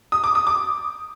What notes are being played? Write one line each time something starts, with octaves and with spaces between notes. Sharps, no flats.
D#6
D6
D#6
D6